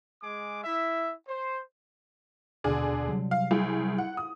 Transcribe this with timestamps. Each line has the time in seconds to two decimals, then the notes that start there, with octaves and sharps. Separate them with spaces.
0.22 G#3 G#4 D6
0.64 E4 E5
1.28 C5
2.64 D#2 B2 D3 G#4 D5
3.08 C3 F#3 G3
3.31 F5
3.51 C2 G#4
3.98 F#5
4.17 D#6